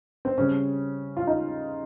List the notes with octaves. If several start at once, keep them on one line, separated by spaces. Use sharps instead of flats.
C4
C#3 G3 C#4
F4
D#4